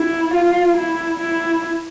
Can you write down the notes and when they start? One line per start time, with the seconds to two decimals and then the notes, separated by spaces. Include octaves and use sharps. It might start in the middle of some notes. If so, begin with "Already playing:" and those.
Already playing: E4
0.34 F4
0.77 E4
1.20 E4